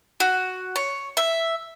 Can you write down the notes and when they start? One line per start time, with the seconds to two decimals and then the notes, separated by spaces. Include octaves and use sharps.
0.20 F#4
0.76 C#5
1.17 E5